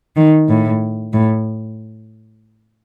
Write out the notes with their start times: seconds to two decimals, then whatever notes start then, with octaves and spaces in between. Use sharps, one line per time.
0.15 D#3
0.48 A2
1.13 A2